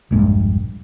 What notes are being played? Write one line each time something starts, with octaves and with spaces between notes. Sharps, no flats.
E1 A#1 G2 G#3